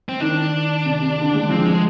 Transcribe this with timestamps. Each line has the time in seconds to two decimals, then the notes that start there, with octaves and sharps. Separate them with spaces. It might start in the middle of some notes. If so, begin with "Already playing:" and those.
0.09 C4
0.20 D#3 D4
0.85 C3
1.01 C3
1.18 D3
1.34 G#3
1.49 F3 C4
1.65 G#3